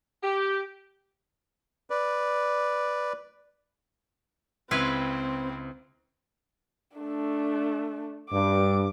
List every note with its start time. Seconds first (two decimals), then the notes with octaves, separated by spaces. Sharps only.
0.23 G4
1.90 B4 D5
4.71 C#2 C4 E4 B4 F5 C6 G#6
6.98 A3 D4
8.31 G2 D6